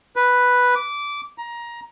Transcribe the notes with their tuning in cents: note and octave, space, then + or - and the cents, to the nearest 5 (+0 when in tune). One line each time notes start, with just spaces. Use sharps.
B4 +0
D6 -15
A#5 +20